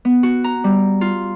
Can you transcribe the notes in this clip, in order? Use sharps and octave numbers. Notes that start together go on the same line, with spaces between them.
B3
F#4
A#5
G3
F4